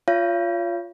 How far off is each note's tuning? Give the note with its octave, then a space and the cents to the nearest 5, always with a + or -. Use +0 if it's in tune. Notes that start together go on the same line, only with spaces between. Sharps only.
F4 +0 C#5 +25 F5 -40